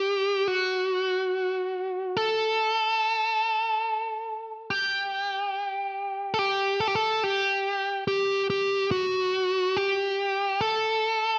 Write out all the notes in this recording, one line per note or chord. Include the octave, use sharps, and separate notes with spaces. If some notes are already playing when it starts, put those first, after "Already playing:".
Already playing: G4
F#4
A4
G4
A4
G4
A4
G4
A4
G4
G4
G4
F#4
G4
A4